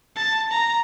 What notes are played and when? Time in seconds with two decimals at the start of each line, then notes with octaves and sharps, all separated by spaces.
0.16 A5
0.51 A#5